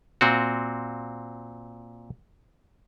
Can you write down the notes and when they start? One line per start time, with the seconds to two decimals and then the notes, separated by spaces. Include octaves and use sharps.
0.21 A#2 C4 F#4